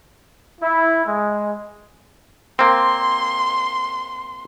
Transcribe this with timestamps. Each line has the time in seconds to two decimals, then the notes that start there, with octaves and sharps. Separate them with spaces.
0.61 E4
1.06 G#3
2.59 A#3 C4 C6